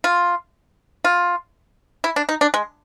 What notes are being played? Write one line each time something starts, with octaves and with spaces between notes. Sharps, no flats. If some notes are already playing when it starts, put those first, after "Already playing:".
F4
F4
E4
D4
D#4
D4
G#3